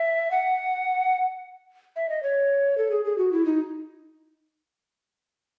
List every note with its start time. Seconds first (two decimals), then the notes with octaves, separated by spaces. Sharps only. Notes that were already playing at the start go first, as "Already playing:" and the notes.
Already playing: E5
0.31 F#5
1.96 E5
2.09 D#5
2.23 C#5
2.78 A4
2.91 G#4
3.05 G#4
3.18 F#4
3.33 E4
3.45 D#4